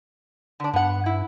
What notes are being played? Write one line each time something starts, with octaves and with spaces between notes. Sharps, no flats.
D3 D4
G2 B3 F#5
E4